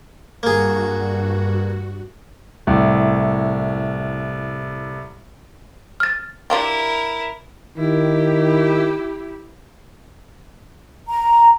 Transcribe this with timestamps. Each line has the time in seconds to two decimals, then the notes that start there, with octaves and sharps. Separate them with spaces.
0.43 G2 A#3 F#4 G#4
2.67 C2 A2
6.00 F6 A6
6.50 D4 E4 F4 G4 A#4
7.78 D#3 E4 G4
11.08 A#5